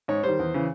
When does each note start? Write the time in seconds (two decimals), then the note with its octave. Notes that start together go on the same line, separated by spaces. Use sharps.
0.08 G#2 C#5
0.23 D#3 G3 C5
0.39 E2
0.54 C#3 E3